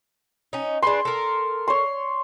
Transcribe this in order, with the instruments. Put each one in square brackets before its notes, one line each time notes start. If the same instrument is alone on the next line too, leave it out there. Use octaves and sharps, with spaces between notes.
[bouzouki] C#4 D#4
[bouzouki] D4 G#4 B4 [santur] C6
[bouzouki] A4 A#4
[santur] C#5 C6